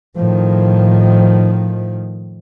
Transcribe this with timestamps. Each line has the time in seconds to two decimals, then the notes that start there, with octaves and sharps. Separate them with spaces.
0.17 A2 D#3 F3